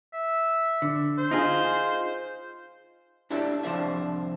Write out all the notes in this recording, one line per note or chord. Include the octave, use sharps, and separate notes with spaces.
E5
D3
C5
D#4 F4 G#4
D4 E4 G4 A4 D5 E5
C2 C3 F3 D4 C5 E5